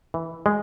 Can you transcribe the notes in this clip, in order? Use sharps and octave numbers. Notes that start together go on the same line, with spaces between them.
E3
G#3